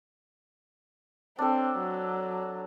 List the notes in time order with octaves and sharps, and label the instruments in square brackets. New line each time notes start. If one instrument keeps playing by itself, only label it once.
[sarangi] C4 [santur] D4 A4
[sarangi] F#3